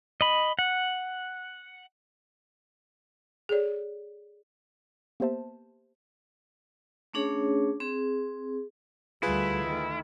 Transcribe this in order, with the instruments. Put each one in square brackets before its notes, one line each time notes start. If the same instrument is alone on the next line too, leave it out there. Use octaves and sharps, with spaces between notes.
[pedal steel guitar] D#5 B5
F#5
[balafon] G#4 A4 C#5 D5
[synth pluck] A#3 B3 G4 C5 E5 A5
[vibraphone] A3 C#4 D4 G#4 C#5
C4 G#4
[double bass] D2 G3 [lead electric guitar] E4 [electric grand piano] F4 G#4 B4
[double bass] D#3 A3